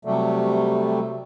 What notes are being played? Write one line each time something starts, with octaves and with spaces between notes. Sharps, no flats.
C3 F#3 G3 A3